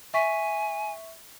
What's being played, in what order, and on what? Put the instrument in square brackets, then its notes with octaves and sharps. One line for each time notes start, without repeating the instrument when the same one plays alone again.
[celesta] E5 C#6 B6 [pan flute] G#5